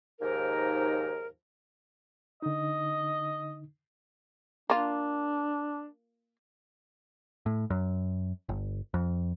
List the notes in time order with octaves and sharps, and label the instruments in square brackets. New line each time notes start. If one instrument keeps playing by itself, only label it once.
[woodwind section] D#2 G#2 F3 D#4 A#4
[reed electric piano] D3 D#4 [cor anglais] D#5
[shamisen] A#3 F4 [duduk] D4
[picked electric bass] A2
F#2
G1
F2